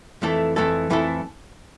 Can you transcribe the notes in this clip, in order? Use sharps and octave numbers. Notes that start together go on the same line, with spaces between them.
F2 E3 A3 E4 A4
F2 E3 A3 E4 A4
F2 E3 A3 E4 A4